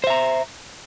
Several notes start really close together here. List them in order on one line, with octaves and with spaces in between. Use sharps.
C5 E5 A#5